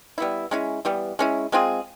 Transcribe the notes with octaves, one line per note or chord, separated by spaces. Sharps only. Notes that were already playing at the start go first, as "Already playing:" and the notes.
G3 B3 E4
G#3 C#4 E4
E3 G3 B3
G#3 C#4 E4
G#3 C4 F4 G#4